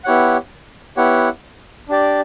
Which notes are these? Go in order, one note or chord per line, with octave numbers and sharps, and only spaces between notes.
B3 E4 G4 C#5 F#5
B3 E4 G4 C#5 F#5
D4 G4 D5